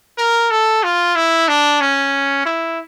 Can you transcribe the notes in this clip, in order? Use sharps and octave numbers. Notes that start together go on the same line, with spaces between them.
A#4
A4
F4
E4
D4
C#4
E4